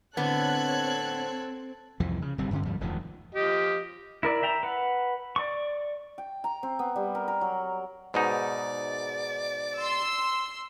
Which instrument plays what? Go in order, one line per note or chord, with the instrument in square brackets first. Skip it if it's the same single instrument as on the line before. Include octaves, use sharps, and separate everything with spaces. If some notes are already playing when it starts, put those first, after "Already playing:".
[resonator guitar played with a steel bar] A2 D3 B3 [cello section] C4 [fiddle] A4 [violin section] C#5 F#6 G#6
[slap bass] C2 F2 E3 F3
C#3
G1 C3 G3 C4
G2 D3 C#4
D2 G#2 F3 G3
E1 D2 D#3 F3
[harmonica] F3 G4 D#5
[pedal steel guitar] E4 A#4 D5
E5 G5 A#5
B4 F#5
D5 C#6
[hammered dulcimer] G5
A#5
C4
B3
G3
A#4
A#4
F#3
[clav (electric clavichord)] G#2 B2 D#4 [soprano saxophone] D5
[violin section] C6 E6